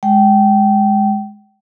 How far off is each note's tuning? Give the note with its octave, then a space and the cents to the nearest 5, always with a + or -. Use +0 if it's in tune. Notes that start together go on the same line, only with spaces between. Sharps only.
G#3 +0 G5 -25